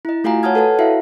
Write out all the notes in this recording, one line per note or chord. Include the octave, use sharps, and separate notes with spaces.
E4 D#5
A3 F4 F#4 F5 G#5 A#5
C#5 F#5 A5 D#6 F6 G#6
A4 B4 C#5 A5
E4 F#4 E5 F5